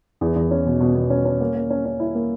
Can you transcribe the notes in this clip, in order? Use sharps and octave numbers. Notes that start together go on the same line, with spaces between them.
E2
E2
C#4
B2
B2
B2
C#4
C#4
A#3
A#3
C#4
C#4
E4
A#3